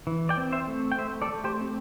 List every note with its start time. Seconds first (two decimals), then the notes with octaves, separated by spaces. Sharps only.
0.07 E3
0.29 D5 G5
0.37 C4
0.52 C5 E5
0.68 A3
0.92 G5
0.99 A3 C5 E5
1.22 A4 D5
1.29 A3
1.44 G4 C5
1.61 C4